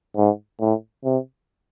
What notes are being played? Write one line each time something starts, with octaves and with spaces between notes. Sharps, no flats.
G#2
A2
C3